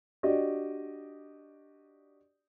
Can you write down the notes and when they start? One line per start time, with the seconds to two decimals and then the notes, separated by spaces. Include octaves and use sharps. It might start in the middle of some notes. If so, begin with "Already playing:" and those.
0.23 D4 F#4 G4 D5 D#5